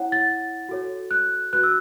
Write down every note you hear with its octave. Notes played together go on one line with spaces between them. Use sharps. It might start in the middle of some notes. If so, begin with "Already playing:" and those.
Already playing: E4 C#5 F#5
A6
F#4 A4 C#5
F#6
F#4 B4 F#6
E6